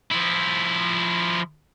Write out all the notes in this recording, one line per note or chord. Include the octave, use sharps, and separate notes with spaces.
F3 E4